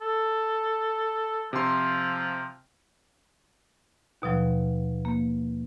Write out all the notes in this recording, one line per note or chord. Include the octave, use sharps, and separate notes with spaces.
A4
C3 F3 C6
D#2 B2 F3 F#3
A#3